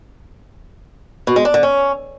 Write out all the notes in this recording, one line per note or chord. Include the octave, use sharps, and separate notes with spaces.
B2
G#3
D4
D3
C#4